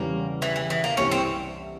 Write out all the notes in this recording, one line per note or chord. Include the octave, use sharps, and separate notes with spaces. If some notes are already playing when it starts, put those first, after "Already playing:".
Already playing: E2 C#3 G3 A#3
E3
E3
E3
A#3
C2 C3 G3 C#4
C4